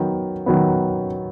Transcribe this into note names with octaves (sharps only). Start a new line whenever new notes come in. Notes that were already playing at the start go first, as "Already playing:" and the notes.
Already playing: D#3 F#3 B3
D#3 F#3 B3